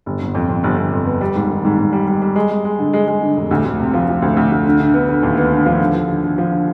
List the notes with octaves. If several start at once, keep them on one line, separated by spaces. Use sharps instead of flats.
G1
G1
F2
F2
G1
G1
F2
B3
G3
G#2
D#3
G#2
G#2
G3
G3
G3
G#3
G#3
G#3
D3
G#3
G#3
D3
F1
D2
D2
C3
F3
F3
D2
D2
D2
D3
D3
B3
D3
D#2
B3
D3
F3
D3
F3
D3
D3
F3
D3